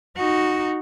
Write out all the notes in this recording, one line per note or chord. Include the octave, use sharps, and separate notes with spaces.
D#4 F#4